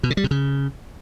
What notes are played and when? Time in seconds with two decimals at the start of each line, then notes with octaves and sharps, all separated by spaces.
0.03 B2
0.10 C#3
0.17 G3
0.24 C3
0.31 C#3